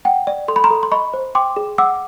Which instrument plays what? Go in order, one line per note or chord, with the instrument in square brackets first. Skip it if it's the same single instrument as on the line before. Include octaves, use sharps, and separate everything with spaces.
[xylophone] F#5 G5
D5
A4 C6
B5
A#5 C6
A4
C6
D#5 B5 C#6
C5
G5 C6 D6
G#4
F#5 D6 E6